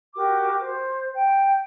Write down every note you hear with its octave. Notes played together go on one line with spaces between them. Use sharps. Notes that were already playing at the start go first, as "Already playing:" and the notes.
F#4 G4 A#4 D6
C5
G5